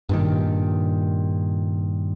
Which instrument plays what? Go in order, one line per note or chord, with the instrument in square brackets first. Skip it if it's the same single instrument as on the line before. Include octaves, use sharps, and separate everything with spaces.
[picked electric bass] G2 A#2 D#3